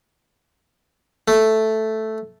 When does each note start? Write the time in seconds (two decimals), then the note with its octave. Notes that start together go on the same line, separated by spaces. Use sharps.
1.28 A3